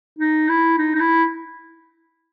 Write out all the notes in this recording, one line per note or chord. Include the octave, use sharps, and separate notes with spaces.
D#4
E4
D#4
D#4
E4